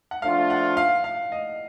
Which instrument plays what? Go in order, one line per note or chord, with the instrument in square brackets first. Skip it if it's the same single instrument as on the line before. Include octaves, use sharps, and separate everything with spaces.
[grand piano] F#5
[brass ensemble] F3 A3 D4 F4 [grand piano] F5
[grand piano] F#5
F5
F5
D#5